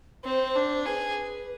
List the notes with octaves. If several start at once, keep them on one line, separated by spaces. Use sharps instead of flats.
C4 C5
D4
G#4 B4